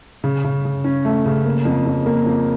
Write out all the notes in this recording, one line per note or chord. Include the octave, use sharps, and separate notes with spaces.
C#3
C#3
C#3
C#4
A3
C#3
A#3
F2
F2
A#3
F2